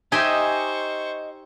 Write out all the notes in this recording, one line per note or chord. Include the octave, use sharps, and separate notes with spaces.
D#4 G4 C5 D#5 E5 G#5 C#6